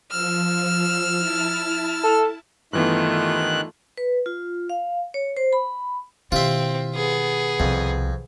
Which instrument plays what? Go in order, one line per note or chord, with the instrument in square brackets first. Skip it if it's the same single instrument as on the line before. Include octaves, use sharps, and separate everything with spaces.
[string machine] F3 [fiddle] E6 F6
[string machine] E4 A5
[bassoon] A4
[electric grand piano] G2 E3 B3 [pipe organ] D#3 F#6 [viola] A3 F4
[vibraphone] B4
F4
F5
C#5
C5
B5
[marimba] B2 D#3 G4 [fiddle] C4 [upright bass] E4 [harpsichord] F4 E5
[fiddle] B3 G#4
[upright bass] C2 [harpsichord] F2